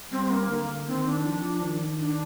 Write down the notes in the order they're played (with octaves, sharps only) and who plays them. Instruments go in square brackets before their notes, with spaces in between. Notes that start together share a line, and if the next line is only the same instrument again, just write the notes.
[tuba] G3 [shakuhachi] C4
[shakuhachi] C4
A#3
[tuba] D3
[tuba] D#3 [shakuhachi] C4
[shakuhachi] D4
[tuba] F3
D#3
[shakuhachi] D4